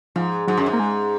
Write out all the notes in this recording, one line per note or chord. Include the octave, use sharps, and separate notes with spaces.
G#2 F3
G#2 F#3
F#2
G#2
A#3
G#3